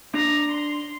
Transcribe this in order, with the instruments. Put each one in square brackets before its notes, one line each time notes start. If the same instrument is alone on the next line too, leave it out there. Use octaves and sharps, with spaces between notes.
[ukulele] D4 [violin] A#5
[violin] C6